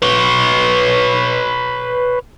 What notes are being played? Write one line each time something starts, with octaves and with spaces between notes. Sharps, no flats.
B4 C#5